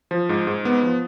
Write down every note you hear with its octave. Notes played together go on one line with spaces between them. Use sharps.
F3
G#2
G#2
B3
F3